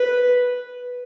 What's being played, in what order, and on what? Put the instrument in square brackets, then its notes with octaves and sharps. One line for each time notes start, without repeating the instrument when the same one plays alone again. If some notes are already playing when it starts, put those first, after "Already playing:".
Already playing: [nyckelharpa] B4